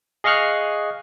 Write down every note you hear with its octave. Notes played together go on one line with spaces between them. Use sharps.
G#4 D#5 F5 C#6 F6 F#6